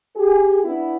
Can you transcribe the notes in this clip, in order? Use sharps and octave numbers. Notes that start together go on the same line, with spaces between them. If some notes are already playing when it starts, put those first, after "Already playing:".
G4 G#4
B3 D4 E4